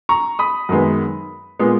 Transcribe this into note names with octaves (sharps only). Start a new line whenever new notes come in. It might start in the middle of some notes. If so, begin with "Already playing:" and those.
A#5 C#6
B5 D#6
F#2 D#3 G#3 B3
A#2 G#3 B3